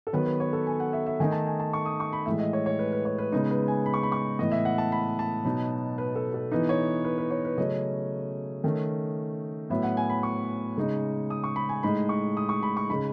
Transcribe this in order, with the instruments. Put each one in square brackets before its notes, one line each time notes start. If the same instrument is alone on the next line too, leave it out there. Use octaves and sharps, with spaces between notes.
[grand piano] A4
D#3 F#3 B3 B4
B4
C#5
A4
G#5
F#5
E5
E5
D#3 A3 D#4 G#5
A5
G#5
A5
C#6
D#6
C#6
B5
A2 E3 G#3 E5
D#5
C#5
C#5
B4
B4
C#5
B4
C#3 G#3 B3 D#4
B4
G#5
B5
C#6
B5
C#6
A2 E3 B3 D#5
E5
F#5
A5
B5
A5
B2 F#3 B3 D#4
B4
A4
A4
E3 B3 D#4 B4
C#5
B4
B4
C#5
B4
C#3 F#3 A3 C#4 D#5
D#3 A3 C#4
A2 F#3 B3 E5
F#5
G#5
B5
C#6
C#3 G#3 D#4
D#6
C#6
B5
G#5
A2 G#3 D#4 B5
C#6
D#6
C#6
B5
C#6
C#3 G#3 D#4 B5